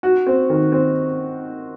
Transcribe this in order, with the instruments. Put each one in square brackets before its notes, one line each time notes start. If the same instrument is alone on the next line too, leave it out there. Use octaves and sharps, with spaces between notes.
[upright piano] F#4
C4
D#3
C4